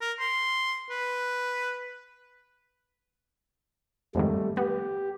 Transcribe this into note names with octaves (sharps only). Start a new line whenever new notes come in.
A#4
C6
B4
F2 G#2 D#3 G3 A3
B3 G4